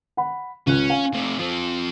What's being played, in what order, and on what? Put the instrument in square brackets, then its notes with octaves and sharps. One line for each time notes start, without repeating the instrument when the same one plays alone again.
[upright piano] F#5 B5
[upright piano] C#2 F#6 [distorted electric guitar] C#4
[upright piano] F5 G#5
[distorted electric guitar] C3 A3
F3 C4